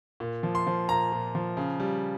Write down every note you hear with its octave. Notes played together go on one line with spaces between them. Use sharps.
A#2
F3
C6
F3
A#2 A#5
A#2
F3
C#3
G3